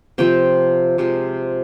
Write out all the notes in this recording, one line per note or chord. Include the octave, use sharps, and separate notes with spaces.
C3 F3 C4 G5
C3 F3 G#3